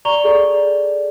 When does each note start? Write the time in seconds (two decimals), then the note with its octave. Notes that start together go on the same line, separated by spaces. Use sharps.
0.05 D5 A#5 C#6 F7 G7
0.24 G#4 A4 D5